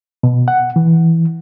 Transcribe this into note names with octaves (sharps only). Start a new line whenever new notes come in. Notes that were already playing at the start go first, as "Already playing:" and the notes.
B2
F#5
E3